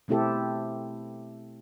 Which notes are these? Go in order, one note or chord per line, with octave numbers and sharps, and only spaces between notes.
B2 A3 C4 E4 G4 A4